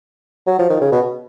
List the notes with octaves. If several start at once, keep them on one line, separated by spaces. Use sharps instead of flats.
F#3
F3
D#3
C#3
B2